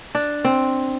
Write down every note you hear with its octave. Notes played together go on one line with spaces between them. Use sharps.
D4
C4